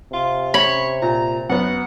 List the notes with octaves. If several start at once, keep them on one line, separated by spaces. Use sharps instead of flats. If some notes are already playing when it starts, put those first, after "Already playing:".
C3 F4
C#5 B5
A#2 A#5
F#2 B3 F#5